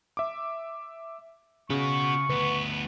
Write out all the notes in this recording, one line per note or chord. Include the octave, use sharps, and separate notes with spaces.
E5 D6
C#3 B3 F#4 C#6
D2 B3 B4